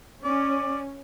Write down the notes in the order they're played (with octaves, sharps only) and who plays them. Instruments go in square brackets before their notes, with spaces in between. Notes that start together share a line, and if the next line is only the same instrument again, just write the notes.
[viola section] C#4 [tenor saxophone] D5